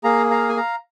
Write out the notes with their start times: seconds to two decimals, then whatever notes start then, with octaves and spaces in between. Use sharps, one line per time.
0.04 A#3 G#4 F5 A#5
0.31 F5 A#5
0.49 G#5
0.57 F5 A#5